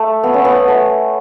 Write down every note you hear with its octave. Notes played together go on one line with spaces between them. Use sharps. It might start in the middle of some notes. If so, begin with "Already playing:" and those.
Already playing: A3
B3
C#4
B3
A3